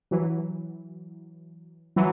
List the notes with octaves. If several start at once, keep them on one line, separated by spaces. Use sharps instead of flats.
E3 F#3
E3 F#3